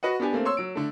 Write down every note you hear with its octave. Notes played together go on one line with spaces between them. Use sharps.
F#4 B4 D#5 F#5
B3 D4 G4 G#5
A3 A#3 C4
C#5 C6 E6
F#3 D7
D3 A3